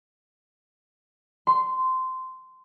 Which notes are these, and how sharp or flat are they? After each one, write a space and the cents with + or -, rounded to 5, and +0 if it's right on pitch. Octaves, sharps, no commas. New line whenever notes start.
C6 -15